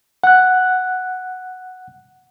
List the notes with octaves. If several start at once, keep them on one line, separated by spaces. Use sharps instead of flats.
F#5 F#6